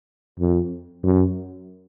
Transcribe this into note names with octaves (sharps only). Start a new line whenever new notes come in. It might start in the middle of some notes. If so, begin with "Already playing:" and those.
F2
F#2